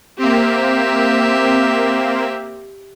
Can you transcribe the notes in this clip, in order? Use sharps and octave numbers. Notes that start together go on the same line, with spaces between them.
A#3 C4 G4 E5